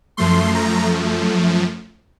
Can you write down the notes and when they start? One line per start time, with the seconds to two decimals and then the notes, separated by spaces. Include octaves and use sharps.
0.17 F#2 F3 A3 C6
0.54 A#5